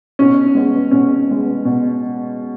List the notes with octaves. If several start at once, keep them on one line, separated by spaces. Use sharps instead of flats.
B2 C#4
G#3 B3
B2 C#4
G#3 B3
B2